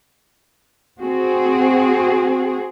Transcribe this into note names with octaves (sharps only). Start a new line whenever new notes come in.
C4 F#4 G#4